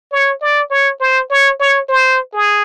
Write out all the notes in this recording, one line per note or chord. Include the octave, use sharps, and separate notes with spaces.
C#5
D5
C#5
C5
C#5
C#5
C5
G#4